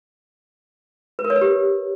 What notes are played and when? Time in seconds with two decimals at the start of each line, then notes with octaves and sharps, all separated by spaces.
1.19 B4
1.24 A#4
1.30 C#5
1.36 B4
1.41 G4